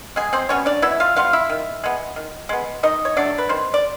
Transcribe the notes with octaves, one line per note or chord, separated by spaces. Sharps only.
B2 G#3 G#4
C4 C5
G3 B3 C#4 C#5
D4 D5
B2 E4 E5
F4 F5
G3 B3 F4 F5
E4 E5
D#3
G#3 B3
D#3
G#3 B3
D#3 D#4 D#5
C#5
F#3 A3 D4 D5
B4
D#3 C4 C5
D5